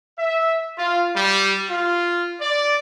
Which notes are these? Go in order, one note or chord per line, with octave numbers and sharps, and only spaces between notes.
E5
F4
G3
F4
D5